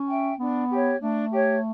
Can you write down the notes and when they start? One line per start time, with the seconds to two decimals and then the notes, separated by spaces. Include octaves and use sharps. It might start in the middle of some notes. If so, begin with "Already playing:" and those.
Already playing: C#4
0.09 E5 G5
0.39 B3 D4
0.71 G4 C#5
1.00 A3 D4
1.32 G4 C#5